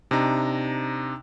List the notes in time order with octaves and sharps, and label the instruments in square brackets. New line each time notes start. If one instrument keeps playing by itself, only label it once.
[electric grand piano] C3 D4 D#4 A#5